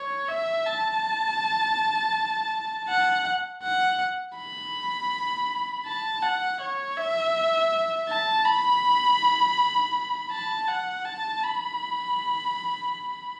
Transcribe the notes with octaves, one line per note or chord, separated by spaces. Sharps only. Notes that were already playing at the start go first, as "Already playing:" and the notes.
Already playing: C#5
E5
A5
F#5
F#5
B5
A5
F#5
C#5
E5
A5
B5
A5
F#5
A5
B5